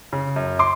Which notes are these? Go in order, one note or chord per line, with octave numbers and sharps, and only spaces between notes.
C#3
F#2
C6 D6